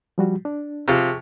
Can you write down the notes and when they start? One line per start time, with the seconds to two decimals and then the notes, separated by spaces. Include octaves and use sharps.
0.18 F3 G3 F#4
0.45 D4
0.88 C3 F3 F4 G#4 C#6